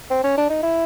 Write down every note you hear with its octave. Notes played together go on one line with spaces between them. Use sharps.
C4
C#4
D4
D#4
E4